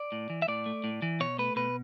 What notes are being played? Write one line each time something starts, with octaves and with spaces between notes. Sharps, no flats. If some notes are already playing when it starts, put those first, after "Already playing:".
Already playing: D5
A2
E3
E5
A2 D5
A3
A2
E3
B2 C#5
A3 B4
B2 B4